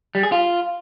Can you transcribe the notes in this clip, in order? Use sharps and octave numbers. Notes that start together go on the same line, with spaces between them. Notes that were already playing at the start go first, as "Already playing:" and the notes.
G3
G#4
F4